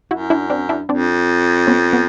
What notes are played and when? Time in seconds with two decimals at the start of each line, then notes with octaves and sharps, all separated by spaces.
0.11 F#2 E4 F#4
0.30 D4 E4
0.50 C4 D4
0.69 D4 E4
0.89 F2 C4 D4
1.67 B3 C#4
1.93 B3